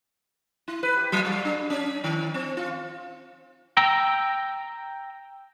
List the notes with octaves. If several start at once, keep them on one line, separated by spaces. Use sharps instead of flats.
E4
B4
G4
F#3
G3
D4
C#4
D#3
C4
F4
G5 A#5 E6